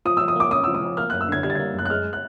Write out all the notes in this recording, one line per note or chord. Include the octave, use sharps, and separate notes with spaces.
F3 D#6
F3 E6
D#6
A#3 D6
C#4 D#6
F3 E6
D#6
F3
A#3 F6
F#2 F#6
E6
D3 G#6
G3 G#6
A6
A#3 G#6
F#2 F#6
F#6
G#3 F6
F#6